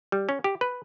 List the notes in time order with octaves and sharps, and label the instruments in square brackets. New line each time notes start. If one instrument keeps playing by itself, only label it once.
[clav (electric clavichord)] G3
C#4
G4
B4